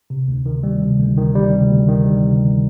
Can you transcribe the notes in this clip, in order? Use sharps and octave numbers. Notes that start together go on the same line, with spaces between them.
C3
D2
D#3
G3
C3
D2
D#3
G3
C3
D2
D#3
G3
C3
D2